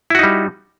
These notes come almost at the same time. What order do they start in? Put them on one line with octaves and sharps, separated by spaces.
E4 F#4 D#4 G3